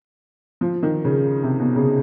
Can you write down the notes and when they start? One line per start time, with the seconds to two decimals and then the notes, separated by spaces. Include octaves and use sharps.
0.61 F3
0.83 D#3
1.05 C#3
1.43 C3
1.60 B2
1.76 C#3